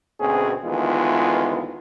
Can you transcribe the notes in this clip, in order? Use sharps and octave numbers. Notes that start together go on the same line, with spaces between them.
D2 B2 C4 C#4 G#4
D2 D#3 E3 G#3 B3 F4